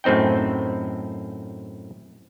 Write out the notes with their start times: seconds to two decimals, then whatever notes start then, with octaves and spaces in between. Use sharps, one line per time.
0.04 F#2 A2 C4 D#4 G5